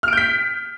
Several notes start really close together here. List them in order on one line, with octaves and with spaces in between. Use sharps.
F6 D7 G6 B6